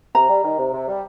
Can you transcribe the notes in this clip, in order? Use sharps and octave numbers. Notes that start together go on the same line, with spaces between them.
C3 A#5
G3
D#3
C3
C3
G3